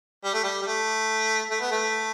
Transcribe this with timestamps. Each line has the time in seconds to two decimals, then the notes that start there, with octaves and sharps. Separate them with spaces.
0.24 G3
0.34 A3
0.44 G3
0.62 G3
0.67 A3
1.51 A3
1.60 B3
1.71 A3